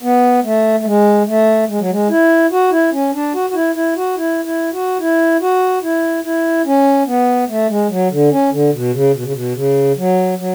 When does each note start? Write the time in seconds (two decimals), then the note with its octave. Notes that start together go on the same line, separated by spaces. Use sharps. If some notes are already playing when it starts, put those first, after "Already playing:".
0.03 B3
0.44 A3
0.80 A3
0.85 G#3
1.27 A3
1.69 G#3
1.80 F#3
1.91 G#3
2.09 E4
2.52 F#4
2.71 E4
2.92 C#4
3.14 D4
3.34 F#4
3.50 F#4
3.55 E4
3.75 E4
3.97 F#4
4.17 E4
4.45 E4
4.73 F#4
5.00 E4
5.41 F#4
5.83 E4
6.25 E4
6.66 C#4
7.07 B3
7.48 A3
7.69 G#3
7.90 F#3
8.11 D3
8.31 C#4
8.52 D3
8.73 B2
8.93 C#3
9.14 B2
9.23 C#3
9.32 B2
9.55 C#3
9.97 F#3
10.38 F#3